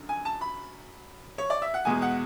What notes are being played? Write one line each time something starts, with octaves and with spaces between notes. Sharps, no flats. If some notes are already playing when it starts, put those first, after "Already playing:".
Already playing: F#2 D3 F#3
G#5
A5
B5
C#5
D5
E5
F#5
E2 B2 G#3 G#5
F#5